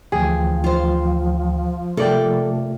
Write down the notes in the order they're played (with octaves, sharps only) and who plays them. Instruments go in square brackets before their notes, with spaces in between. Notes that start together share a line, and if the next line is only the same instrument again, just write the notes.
[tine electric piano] D2 E3 G5 [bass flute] F3 [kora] G#4
[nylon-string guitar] F4 C5
[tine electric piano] C3 A3 F4 [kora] A#3 D5 G5 [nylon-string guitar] A4